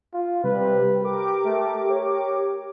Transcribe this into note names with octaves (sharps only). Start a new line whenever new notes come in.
F4
C3 G3 B4
G4 A#4 D6
A3
C#5